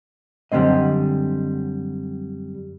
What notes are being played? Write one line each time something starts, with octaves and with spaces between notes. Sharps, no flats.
F#2 D3 G3 G#3 C4 D#5